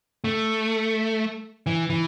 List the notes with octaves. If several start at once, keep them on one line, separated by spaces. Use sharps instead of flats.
A3
E3
E3